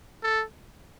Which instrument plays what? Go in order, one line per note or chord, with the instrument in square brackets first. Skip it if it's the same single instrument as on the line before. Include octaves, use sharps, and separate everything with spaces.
[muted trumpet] A4